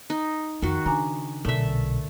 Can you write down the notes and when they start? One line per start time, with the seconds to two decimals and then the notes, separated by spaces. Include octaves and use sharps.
0.10 D#4
0.62 F2 D#3 F#4
0.86 C#3 D4 G#5 A#5
1.45 B1 A#2 D3 A3 E5